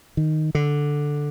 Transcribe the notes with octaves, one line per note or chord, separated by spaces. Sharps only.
D#3
D3